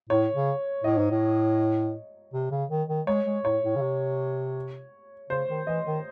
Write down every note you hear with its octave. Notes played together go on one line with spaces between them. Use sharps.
A2 C#5
C#3
A2 D#5
G#2
A2
C3
C#3
D#3
D#3
G#3 C#5
G#3
A2 C#5
A2
C#3
C3
C#3 C5
D#3
E3 D#5
D#3